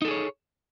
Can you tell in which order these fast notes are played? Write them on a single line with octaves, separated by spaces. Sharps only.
D#4 A4 G#4 C#5